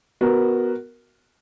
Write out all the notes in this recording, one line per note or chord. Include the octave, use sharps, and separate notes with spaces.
B3 F#4 A#4